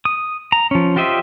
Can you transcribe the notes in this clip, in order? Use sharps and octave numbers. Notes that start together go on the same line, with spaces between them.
D#6
A#5
F3 C#4
F4 G4 C5 D#5 E5